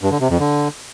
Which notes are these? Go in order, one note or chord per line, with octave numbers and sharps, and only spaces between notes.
G2
D3
C3
F2
D3